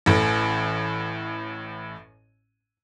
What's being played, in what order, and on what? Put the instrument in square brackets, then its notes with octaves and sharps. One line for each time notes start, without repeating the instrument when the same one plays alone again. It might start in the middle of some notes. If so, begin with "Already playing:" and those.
[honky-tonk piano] A1 A2